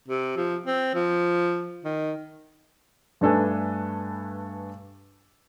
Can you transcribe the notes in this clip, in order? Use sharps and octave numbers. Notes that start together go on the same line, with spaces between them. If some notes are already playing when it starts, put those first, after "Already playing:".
C3
F3
C4
F3
D#3
G2 A3 D4 A4 B4 G#5